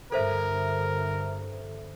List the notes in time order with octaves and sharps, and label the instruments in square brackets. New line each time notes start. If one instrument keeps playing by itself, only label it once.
[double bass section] G2 D3 [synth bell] A4 C5 E5 [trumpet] A#4